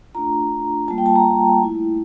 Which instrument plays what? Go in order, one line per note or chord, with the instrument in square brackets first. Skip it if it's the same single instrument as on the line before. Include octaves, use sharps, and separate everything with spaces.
[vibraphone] A3 D4 F4 A#5
G3 A#3 F4 A5
G5
A5
A#5
A3 E4